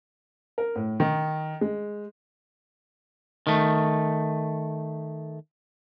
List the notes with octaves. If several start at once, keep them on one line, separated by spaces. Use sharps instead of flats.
A#4
A2
D#3
G#3
D#3 A3